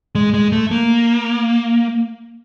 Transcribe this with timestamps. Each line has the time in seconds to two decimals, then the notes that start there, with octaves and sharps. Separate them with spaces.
0.15 G#3
0.34 G#3
0.52 A3
0.71 A#3